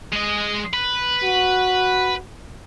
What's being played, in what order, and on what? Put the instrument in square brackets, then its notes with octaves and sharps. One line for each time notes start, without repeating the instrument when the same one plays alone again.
[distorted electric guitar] G#3 D#5
B4
[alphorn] F#4